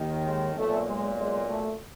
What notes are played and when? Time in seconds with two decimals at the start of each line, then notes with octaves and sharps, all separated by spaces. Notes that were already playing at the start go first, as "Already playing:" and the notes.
Already playing: D#2 D#3
0.25 G#3
0.56 B1 A#2 A3
0.87 G#3
1.18 G#3
1.49 A3